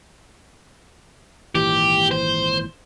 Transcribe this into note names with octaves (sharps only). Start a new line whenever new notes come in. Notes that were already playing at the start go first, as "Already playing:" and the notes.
G#1 A#2 E3 G4
C5